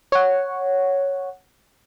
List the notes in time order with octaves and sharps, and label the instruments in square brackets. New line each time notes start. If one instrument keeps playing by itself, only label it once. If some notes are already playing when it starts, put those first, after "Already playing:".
[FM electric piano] C#5 F#5